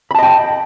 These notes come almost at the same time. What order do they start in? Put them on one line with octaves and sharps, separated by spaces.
B5 A5 D#5 G5